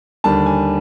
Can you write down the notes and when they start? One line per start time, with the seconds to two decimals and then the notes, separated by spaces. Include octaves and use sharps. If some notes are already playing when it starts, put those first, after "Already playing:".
0.24 D#2 D3 G3 A5
0.46 G#5